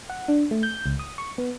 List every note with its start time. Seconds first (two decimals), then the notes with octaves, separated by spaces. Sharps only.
0.10 F#5
0.28 D4
0.51 A3
0.63 G6
0.86 C#2
0.99 D#6
1.18 C#6
1.38 B3